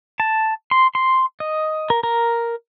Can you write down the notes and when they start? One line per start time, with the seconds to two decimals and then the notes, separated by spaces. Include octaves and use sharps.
0.20 A5
0.71 C6
0.95 C6
1.40 D#5
1.90 A#4
2.03 A#4